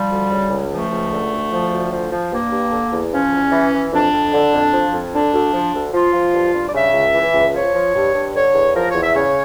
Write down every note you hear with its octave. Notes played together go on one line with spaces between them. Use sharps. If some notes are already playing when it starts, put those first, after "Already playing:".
Already playing: F3 G3
D2
C#3
C#2
F3 A3
C#2
D3
D2
F3
D2
F3
F3
G2 A#3
G2
D3
E2
F3 C#4
E2
E3
E3
F2 D4
F2
D3
F2
F3
F2
D3 D4
D2
F3
D2
F3 F4
F3
G2
G2
D5
C#3 E5
C#2
E3
C#2
F3 C#5
F3
G2
G2
D3 C#5
E2
F3 A#4
C#5
E2
E5
C#3 C#5